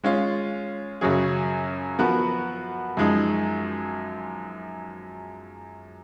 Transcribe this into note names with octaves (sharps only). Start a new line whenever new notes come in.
G#3 C#4 F4
F#2 C#3 F#3 C#4 G#4
F3 B3 F#4 A#4
F#2 F3 G#3 D#4